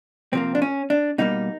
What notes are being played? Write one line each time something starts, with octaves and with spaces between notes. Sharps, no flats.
C3 F3 A#3 C4
D4
C#4
D4
B2 G3 A#3 D#4